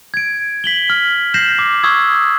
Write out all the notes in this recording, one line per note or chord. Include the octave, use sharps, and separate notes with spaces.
G#6 D7
B6 F#7 G7
F6
G6 A#6 C7 E7 F#7
D6
C#6 D#6 E6 G#6